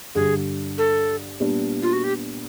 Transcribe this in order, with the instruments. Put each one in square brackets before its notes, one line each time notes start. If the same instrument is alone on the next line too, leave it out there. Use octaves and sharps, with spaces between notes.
[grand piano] G2 D3 G3 [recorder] G#4
[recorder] A4
[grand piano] A#2 G3 B3 D4
[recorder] F4
F#4
G4